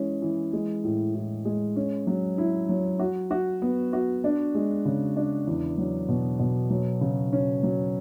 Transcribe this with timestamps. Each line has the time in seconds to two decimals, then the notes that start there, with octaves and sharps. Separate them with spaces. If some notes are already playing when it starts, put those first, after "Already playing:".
Already playing: E3 G#3 C#4
0.22 E3
0.53 G#3
0.84 A2
1.15 A2
1.45 G#3
1.76 C#4
2.07 F#3
2.38 E4
2.69 F#3
2.99 F#4
3.31 F#4
3.62 B3
3.93 F#4
4.24 D4
4.55 G#3
4.85 C#3
5.16 D4
5.47 E2
5.78 F#3
6.09 B2
6.39 B2
6.70 F#3
7.01 C#3
7.33 C#4
7.63 F#3